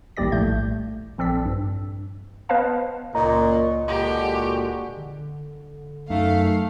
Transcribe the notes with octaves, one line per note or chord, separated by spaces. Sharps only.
G#1 D#2 G3 G4 D5 A#6
A#1 A2 A3 G6
A#1 C4 A4 D5 B6
G2
B3 B4 C5 D#5 F5 A5
C#2 F#2 A#2 C#4 D#5 A#5
A#2 D3 G#3 F#4 G4
D3
F#2 A3 D#4 F5